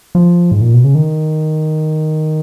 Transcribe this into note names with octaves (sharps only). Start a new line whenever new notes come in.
F3
G#2
A#2
B2
C#3
D#3